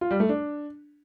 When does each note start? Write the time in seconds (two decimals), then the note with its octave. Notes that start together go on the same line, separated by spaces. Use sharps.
0.01 F4
0.11 G3
0.20 A3
0.29 D4